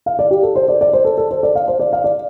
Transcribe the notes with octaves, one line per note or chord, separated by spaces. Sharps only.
F5
D5
G4
A4
C5
D5
D5
C5
A4
A4
C5
D5
F5
C5
D5
F5
D5